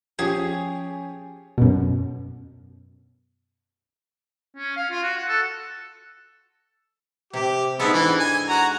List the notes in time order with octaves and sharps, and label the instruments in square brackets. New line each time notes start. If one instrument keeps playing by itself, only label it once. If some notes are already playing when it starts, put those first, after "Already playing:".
[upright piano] F3 C#4 G4 [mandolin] G#4
[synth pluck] F#2 B2
[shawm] C#4
F5
F4
F#4
F#5
A4
[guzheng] C3 [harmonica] G4
[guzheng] G#2 D4 A4 [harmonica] G#3 B3
[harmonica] E3
G#5
F#4 A#5